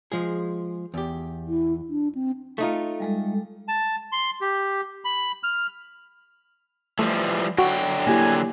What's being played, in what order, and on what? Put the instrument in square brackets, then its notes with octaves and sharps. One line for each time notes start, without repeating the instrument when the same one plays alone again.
[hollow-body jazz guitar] F3 G#3 G#4
E2 G4
[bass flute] E4
D4
C4
[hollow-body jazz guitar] A3 D#4 F4
[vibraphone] G3 G#3 A4
[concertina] A5
C6
G4
B5
F6
[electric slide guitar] E3 F3 G3 [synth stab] A3
[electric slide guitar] D3 F#3 G5 [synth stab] F#4
[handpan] A#3 E4 G4 [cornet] G#5